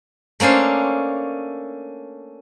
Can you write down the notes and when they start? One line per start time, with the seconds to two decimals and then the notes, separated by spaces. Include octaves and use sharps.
0.40 A3 A#3 C#4 D4 C5